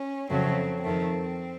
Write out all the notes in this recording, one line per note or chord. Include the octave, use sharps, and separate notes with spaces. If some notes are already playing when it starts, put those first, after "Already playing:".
Already playing: C#4
F2 C#3 F#3 A3 C4
F2 D#3 A3 C4